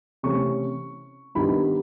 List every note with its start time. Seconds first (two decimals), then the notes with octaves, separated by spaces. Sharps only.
0.23 C3 E3 A3 C#4 C#6
1.35 G2 D#3 G3 B3 D4 B5